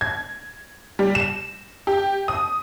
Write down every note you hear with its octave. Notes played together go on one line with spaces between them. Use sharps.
G#6
G3
E7
G4
D#6